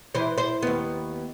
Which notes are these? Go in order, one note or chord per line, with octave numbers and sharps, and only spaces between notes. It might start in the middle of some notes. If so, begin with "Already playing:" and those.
E3 C5
C5
D#2 B3